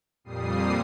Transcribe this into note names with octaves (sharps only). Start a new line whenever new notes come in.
F2 A#2 G3 D#6 C7